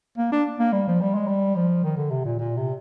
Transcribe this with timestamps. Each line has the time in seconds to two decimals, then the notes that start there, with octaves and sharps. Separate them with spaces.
0.17 A#3
0.32 D4
0.59 A#3
0.73 G3
0.87 F3
1.01 G3
1.15 G#3
1.28 G3
1.56 F3
1.84 D#3
1.96 D3
2.10 C3
2.25 A#2
2.39 A#2
2.57 C3